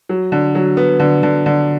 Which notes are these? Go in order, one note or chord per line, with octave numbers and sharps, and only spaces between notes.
F#3
D3
F#3
B3
D3
D3
D3